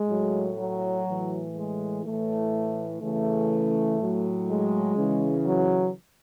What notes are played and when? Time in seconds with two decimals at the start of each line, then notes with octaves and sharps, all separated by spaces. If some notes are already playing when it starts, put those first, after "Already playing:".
Already playing: G#3
0.09 A2 F#3
0.58 F#3
1.07 A2 E3
1.56 G#3
2.04 A2 E3 A3
3.02 C#3 E3 A3
3.99 A2 F#3
4.48 G#3
4.96 C#3 E3
5.45 F#3